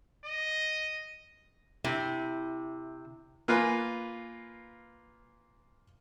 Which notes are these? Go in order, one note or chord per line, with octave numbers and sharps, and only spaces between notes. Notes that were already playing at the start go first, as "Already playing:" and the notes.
D#5
C3 E4
A#3 F4 B4 G#5